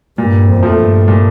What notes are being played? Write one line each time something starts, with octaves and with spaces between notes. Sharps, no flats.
G2 A#2
F2
F3 A3
G2
A#2